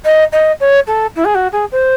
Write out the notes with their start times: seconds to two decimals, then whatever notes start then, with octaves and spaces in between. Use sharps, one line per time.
0.05 D#5
0.33 D#5
0.60 C#5
0.87 A4
1.16 E4
1.25 G#4
1.35 F#4
1.52 G#4
1.72 C5